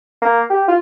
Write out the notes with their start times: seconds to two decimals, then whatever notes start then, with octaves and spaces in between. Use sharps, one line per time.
0.22 A#3
0.50 G4
0.68 F4